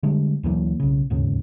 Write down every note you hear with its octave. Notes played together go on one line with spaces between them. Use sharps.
D3 G3 G#3
D2 E3 F#3 A#3
B1 C#3
D1 D#2 G#2 C#3